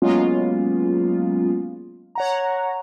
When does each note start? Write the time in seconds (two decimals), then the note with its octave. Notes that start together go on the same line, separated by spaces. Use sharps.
0.02 F#3 G#3 A#3 B3 C#4 F4
2.15 C#5 F#5 A#5